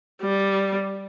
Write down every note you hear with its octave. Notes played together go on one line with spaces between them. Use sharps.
G3